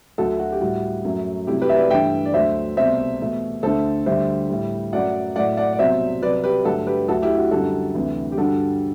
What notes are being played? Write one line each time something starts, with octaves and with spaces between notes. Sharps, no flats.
D2 D3 F#3 A3 F#4 A4
F#4
G4
A2 G3 F#4
F#2 F#3 A3
C2 C3 F#3 A3 E4 G4
G4 B4
E5
B4 D5
G2 E3 A3 E5 G5
D5
D2 D3 F#3 A3 C5 E5
C2 B2 A3 C5 E5
E2 B2 A3
D2 D3 A3 A4 C5
D2 D3 G3 C5 E5
A2 G3
F#2 F#3 A3 D5 F#5
A2 F#3 A3 D5 F#5
D5 F#5
D5
C2 B2 F#3 C5 E5
C2 C3 F#3 B4 D5
G4 B4
G2 D3 F#3 A3 F#4 A4
G4 B4
D2 D3 F#3 A3 F#4 A4
E4 G4
F#4
F#2 D3 G3 F#4 A4
D2 C3 E3
G4
G2 D3 G3 F#4 A4